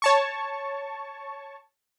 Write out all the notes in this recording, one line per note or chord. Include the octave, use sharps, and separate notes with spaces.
C#5 A5 C#6